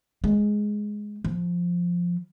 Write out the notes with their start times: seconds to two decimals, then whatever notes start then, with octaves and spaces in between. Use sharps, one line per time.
0.24 G#3
1.24 F3